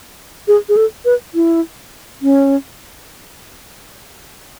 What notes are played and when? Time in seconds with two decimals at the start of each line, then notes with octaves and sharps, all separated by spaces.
0.48 G#4
0.69 G#4
0.77 A4
1.05 B4
1.34 E4
2.22 C#4